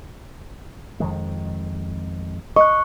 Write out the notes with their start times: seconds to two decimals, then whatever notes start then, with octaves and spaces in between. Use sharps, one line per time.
1.00 F2 D#3 G#3
2.56 D#5 C#6 F#6